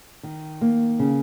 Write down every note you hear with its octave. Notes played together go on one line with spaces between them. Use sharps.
D#3
A#3
C#3